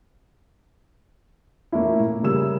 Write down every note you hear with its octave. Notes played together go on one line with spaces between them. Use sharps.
A3 A#3 C#4 E4
A2
C#3 G3 G#4 A#4 E6 E7